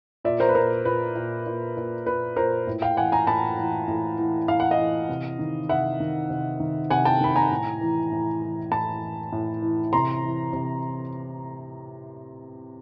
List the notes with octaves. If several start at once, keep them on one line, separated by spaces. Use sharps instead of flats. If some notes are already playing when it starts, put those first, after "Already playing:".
A#2 D5 E5
A#4 C5
B4
A#2 A#4 C5
A#2 B4
A#2
A#2
A#2
A#2 B4
A#2 A#4 C5
A2
F5 G5
E3 F#5 G#5
G#5 A#5
A2 A5 B5
E3
A2
E3
A2 F5
F#5
D#5 F5
E3
C3
D#3
C3 E5 F#5
D#3
C3
D#3
C3 F#5 G#5
G5 A5
D#3 B5
G#5 A#5
A2
E3
A2
E3
A2 A5 B5
E3
A2
E3
C3 A#5 C6
E3
C3